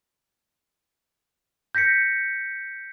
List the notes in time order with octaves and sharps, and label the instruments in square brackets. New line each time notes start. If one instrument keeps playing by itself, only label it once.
[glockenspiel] G6 A#6 B6 C#7